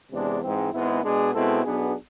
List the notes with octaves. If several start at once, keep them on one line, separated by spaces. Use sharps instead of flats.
E2 C3 G#3 D4
G#2 E3 G#3 C4
G#1 G#2 G#3 B3 E4
B2 G#3 D4 G#4
B2 G#3 C4 E4 A4
B1 B2 B3 D4 G#4